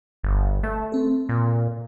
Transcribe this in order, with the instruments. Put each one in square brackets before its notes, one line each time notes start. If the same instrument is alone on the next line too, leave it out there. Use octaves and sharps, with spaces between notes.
[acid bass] G1
[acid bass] A3 [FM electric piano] E5
[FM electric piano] C4 A4
[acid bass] A#2